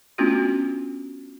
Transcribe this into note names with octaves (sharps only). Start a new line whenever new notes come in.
A3 B3 C#4 D4 F4 F#4